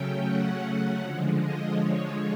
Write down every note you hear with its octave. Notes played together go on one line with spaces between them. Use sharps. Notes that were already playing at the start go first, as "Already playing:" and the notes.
Already playing: C#3 F#3 A3 C#4 G5
F#5
D3 F3 G#3
D#5
C#5